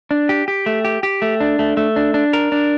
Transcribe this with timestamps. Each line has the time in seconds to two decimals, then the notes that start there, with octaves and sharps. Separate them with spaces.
0.11 D4
0.29 G4
0.48 G4
0.66 A3
0.85 G4
1.03 G4
1.22 A3
1.40 D4
1.59 A3
1.77 A3
1.96 D4
2.14 D4
2.33 A#4
2.52 D4